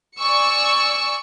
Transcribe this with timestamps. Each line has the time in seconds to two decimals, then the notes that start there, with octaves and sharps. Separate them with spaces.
0.18 D5 G#5 C#6 E6 C#7